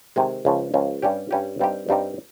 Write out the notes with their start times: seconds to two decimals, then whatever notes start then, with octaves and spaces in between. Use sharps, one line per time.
0.16 C3 D#3 G#3
0.45 C#2 C#3 F3
0.74 C#2 C#3 F3
1.02 G2 G3 C#4 G4
1.31 G2 G3 C#4 G4
1.59 G2 G3 C4 D#4 G4
1.89 G2 G3 C4 D#4 G4